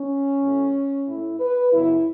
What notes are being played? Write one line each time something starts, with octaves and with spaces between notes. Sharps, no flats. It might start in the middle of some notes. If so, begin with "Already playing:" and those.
Already playing: C#4
E2 B2 F#3 A3
A2 A3 E4
B4
F#2 C#3 E3 B3 E4